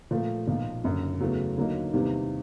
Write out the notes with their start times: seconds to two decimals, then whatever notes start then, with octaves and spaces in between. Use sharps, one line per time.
0.11 A#2 F3 A3
0.47 B1 A#2 F3
0.84 F#1 F#2 D3
1.20 E2 C#3 F#3 A3
1.57 D#2 D3 F#3 A#3 D#4
1.93 E2 C3 D#3 G3 A#3